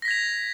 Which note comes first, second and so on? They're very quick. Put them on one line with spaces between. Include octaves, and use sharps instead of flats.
A#6 B6 G#6 F7